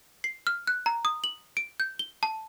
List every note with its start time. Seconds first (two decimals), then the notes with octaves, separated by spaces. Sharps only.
0.24 C7
0.47 F6
0.67 F#6
0.86 A#5
1.05 D#6
1.24 F#7
1.57 D7
1.80 G6
1.99 G7
2.23 A5